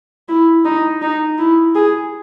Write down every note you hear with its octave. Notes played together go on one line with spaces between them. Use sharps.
E4
D#4
D#4
E4
G#4